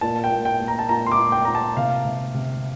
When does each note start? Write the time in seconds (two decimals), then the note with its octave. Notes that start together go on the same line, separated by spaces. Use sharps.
0.01 A#2 A5
0.24 G5
0.31 A#2
0.45 G5
0.61 A#2
0.68 A#5
0.79 A5
0.89 A#2 A#5
1.06 C6
1.11 D6
1.19 A#2
1.32 G5
1.45 A#2 A#5
1.55 A5
1.77 C3 F5
2.05 C3
2.34 C3